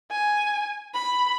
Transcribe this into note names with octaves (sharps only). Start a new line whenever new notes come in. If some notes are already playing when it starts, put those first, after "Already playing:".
G#5
B5